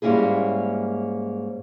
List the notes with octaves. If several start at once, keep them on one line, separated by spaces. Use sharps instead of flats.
G#2 G3 A#3 C#4 E4 G#4